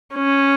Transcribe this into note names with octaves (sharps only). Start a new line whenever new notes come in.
C#4